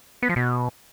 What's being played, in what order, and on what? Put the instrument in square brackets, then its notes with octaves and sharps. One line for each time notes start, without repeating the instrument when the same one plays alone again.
[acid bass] B3
F3
B2